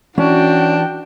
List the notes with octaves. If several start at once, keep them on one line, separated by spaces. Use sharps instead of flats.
E3 C#4 D4 F#4 G5